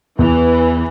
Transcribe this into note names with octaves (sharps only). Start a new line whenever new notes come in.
E2 E3